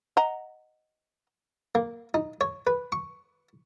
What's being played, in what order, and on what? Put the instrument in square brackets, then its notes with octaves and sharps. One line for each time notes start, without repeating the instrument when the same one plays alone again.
[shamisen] D#5 F#5 A#5
[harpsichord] A#3
D#4
C#5
B4
C#6